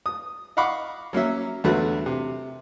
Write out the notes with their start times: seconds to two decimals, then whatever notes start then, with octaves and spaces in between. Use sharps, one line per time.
0.06 D#6
0.57 D#5 F5 F#5 B5 C#6 D6
1.13 F#3 A#3 C#4 E5
1.64 B1 E2 D3 A3 F#4 B4
2.06 C3